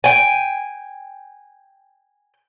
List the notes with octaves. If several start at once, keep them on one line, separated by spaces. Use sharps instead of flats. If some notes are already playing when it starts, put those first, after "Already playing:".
G5 G#5